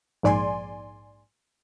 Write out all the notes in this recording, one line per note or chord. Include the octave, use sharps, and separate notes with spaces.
A#1 G#2 D5 G#5 C6